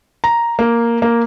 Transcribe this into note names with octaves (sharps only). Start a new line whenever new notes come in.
A#5
A#3
A#3